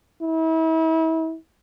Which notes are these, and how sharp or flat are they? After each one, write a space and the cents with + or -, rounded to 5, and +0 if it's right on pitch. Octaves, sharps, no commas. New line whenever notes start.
E4 -35